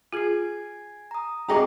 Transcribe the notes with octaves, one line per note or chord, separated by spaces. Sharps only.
F4 G#4 G#5 G#6 C7
A#5 D#6
C4 G4 G#4 D#5 G5 A#5 C#6 D6